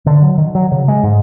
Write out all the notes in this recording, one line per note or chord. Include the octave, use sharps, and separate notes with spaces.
D3
F#3
D#3
F#3
C#3
G#3
G#2